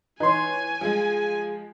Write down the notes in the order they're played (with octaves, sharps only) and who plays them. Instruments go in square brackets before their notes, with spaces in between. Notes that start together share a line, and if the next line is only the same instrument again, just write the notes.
[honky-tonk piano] E3 C#5 [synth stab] D#4 C6 [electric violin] G#5
[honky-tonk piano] F3 G#3 [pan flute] G#4